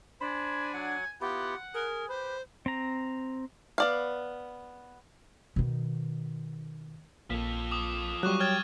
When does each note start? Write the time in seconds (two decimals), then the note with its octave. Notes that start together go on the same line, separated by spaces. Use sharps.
0.21 D4 C5 G#5 B5
0.74 F#3 F#5
1.21 B3 E4 F4 G4 F#5
1.74 G#4 A#4
2.09 G4 B4 C5
2.66 C4 A#5
3.78 B3 D5 F5
5.56 B2 D#3
7.30 A#1 F3 A#3 A4 B6
7.71 D6 D#6
8.23 F#3 G3 C#6 D6 F#6
8.40 C#5 G5 F6 G#6 A6